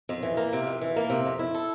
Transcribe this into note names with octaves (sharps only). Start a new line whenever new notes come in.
F2
E3
A#3
C3
F2
E3
A#3
C3
F2
E4
A4